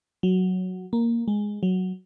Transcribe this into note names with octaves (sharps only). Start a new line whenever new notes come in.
F#3
A#3
G#3
F#3